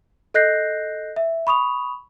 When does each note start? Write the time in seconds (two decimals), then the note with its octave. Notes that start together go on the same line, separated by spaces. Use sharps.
0.34 A4 D#5 F#6 G6 A#6 C7
1.16 E5
1.47 B5 C#6 D#6 F7